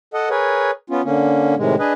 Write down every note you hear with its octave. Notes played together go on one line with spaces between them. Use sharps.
A4 D#5 F#5
G#4 A#4 B4 C#5
B3 C#4 F4
D3 A#3 C#4
A2 C3 D#3 G#3
D4 G#4 B4 D#5